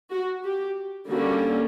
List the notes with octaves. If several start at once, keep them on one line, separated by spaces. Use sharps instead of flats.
F#4
G4
D3 G3 A#3 C#4 F#4